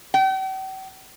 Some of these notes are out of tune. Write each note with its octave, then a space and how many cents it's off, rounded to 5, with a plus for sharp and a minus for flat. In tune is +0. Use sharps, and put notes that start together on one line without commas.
G5 -45